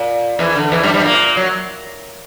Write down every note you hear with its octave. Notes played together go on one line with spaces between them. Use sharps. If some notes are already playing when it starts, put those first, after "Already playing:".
Already playing: A#2
E2 E3
D3
E2 E3
G2 G3
G2 G3
A#2 A#3
F#3